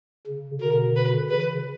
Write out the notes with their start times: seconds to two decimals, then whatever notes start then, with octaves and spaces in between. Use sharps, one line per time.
0.27 C#3
0.61 B2 D3 A#4
0.96 B4
1.30 C#3 E3 B4